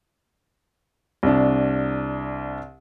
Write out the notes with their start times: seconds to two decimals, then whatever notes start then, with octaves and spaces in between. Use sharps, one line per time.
1.23 C2 D4